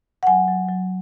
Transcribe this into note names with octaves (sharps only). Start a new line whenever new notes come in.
F#5
F#3 G#5
F#3
F#3